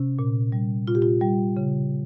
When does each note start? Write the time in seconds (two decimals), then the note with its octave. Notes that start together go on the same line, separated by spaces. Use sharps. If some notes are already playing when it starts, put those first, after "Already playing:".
Already playing: C3 C#4
0.19 A#2
0.52 G3
0.88 A#2 F4
0.95 G4
1.02 F4
1.22 G3
1.57 C#3